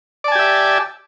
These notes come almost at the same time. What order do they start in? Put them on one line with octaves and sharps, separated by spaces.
D5 A5 G#5 G4 E5